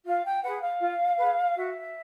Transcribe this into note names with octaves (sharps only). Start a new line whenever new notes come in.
F4 F5
G5
G#4 B4 F#5
F5
F4
G#4 B4
F#4 E5